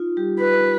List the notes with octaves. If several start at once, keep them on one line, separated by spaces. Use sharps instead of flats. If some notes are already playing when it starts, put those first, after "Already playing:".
Already playing: D#4 F4
G3 G4
B4